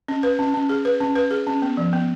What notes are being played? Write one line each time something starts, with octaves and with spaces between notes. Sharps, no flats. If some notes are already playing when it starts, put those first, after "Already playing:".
C#4
B4
C#4
C#4
G#4
B4
C#4
B4
G#4
C#4
B3
F3
B3